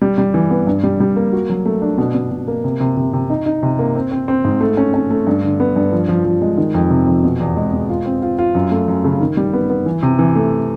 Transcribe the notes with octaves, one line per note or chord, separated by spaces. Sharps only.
G3
G3
E3
B3
G2
G3
G3
A#3
F#4
F#3
A3
D4
B2
B2
B2
A#3
C3
C3
C3
C3
D#4
D#4
C3
A#3
C4
C4
C4
G#2
A3
C#4
C#4
A3
G2
D3
B3
G2
F3
F3
F3
G#3
D#3
F2
C3
F2
B2
E2
G#3
B2
F4
C4
F4
F4
F#2
A3
F#2
C#3
D#3
G3
B3
B3
E3
C3
E3
A3